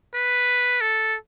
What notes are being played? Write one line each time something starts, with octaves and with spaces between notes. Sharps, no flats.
B4
A4